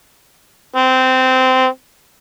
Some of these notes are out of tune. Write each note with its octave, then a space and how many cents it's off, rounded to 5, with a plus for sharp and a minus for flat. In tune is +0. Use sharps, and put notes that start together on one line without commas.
C4 -15